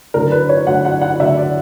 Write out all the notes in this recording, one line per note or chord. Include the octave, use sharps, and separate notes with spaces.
D2 D3 F#3 A#4
B4
C#5
D2 D3 F#3 F#5
F#5
F#5
D2 D3 F#3 E5
D5